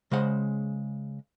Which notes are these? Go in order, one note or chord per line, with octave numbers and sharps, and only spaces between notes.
C#3 G#3 C5 F#5